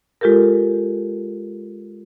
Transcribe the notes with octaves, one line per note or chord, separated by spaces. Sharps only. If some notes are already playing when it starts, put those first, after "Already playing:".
G#3 F4 G4 A4 A#4